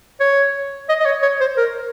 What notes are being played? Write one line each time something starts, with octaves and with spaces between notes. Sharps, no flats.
C#5
D#5
D#5
C#5
C#5
C5
A#4